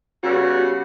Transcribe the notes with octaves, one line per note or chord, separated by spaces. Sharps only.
C#3 G3 B3 F#4